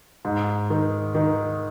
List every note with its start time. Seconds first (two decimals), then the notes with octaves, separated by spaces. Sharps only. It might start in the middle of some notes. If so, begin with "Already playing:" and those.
0.25 G#2
0.70 D#3
1.15 D#3